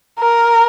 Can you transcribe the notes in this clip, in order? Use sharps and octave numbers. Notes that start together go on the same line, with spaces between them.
A#4